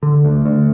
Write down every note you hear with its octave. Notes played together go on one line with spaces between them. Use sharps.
D3
D2
D2